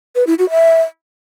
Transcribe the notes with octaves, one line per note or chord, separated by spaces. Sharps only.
B4
E4
F#4
E5